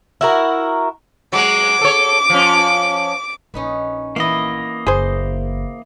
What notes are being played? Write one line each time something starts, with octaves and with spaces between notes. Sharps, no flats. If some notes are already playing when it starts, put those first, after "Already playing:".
E4 F#4 A#4
F#3 G#3 D6
A4 C#5
F3 C#4
A#1 C#4 D#4 B4
E3 A#3 B3 E4 D#5
F#1 G#4 C5